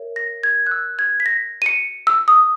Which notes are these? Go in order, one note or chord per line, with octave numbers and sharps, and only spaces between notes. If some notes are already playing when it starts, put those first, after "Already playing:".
Already playing: A#4 C#5 E5
A#6
G#6
F#6
E6
G#6
B6
A#6
D#7
C#7
E6
D#6